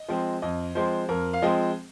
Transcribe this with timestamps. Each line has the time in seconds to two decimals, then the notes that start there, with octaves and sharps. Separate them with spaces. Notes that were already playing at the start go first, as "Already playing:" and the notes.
Already playing: D#5
0.08 F3 G#3 C4
0.42 F2 D#5
0.75 F3 G#3 C4 C5
1.09 F2 A#4
1.33 F5
1.42 F3 G#3 C4 D#5